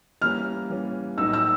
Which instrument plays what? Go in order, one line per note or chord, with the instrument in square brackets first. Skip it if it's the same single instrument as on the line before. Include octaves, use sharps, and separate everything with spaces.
[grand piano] E3 G3 A#3 C#4 [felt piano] F6
[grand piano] E3 G3 A#3 C#4
[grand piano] A2 F#3 B3 D#4 F#4 [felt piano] E6
[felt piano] E6